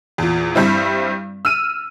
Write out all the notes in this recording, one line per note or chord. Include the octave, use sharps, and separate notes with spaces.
E2 A#2
G2 G3 C4 E4
E6 F6 D#7